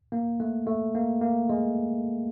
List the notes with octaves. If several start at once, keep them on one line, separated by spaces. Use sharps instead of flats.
A#3
A3
A3
A#3
A#3
G#3